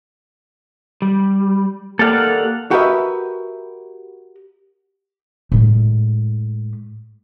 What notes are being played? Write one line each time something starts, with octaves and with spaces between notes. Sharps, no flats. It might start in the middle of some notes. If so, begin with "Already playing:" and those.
G3
A#3 G4 A4 D5 F5 F#5
F#4 G4 A#4 B4 D#5 E5
A2 G#3